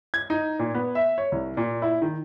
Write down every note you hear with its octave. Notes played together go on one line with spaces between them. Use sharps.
G#6
D#4
A#2
B3
E5
C#5
C2
A#2
E4
D#3